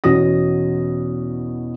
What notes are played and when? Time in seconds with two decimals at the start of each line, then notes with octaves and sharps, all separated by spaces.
0.04 E2 B2 C#4 F#4 D#6 A#6